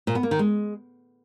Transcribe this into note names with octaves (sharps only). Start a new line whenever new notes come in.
A#2
B3
A#3
D#3
G#3